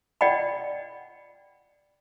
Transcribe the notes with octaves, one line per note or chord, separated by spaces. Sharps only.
F4 D5 D#5 F#5 G5 B5